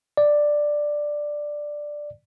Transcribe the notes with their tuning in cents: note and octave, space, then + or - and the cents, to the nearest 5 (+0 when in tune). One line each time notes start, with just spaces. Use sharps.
D5 +5